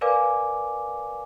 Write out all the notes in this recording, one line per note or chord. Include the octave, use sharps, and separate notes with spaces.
A#4 B4 D5 F5 G#5 D6